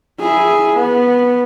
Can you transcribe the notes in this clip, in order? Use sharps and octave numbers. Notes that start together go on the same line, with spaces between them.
E4 G#4
B3